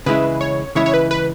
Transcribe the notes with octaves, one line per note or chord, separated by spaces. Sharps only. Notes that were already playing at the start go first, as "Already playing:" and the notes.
C#3 E3 G#3 E4 B4
C#5
C#3 E3 G#3 E4 C#5
C#5
B4
B4